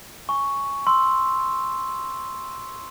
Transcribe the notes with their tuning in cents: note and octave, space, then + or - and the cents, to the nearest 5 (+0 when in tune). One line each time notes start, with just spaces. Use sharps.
G#5 +5 C#6 +0
C6 +0 E6 +0